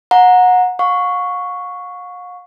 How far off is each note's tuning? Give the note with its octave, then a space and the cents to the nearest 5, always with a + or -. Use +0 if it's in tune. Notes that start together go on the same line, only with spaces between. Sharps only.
F#5 -25 A#5 +0
F5 +45 C#6 +0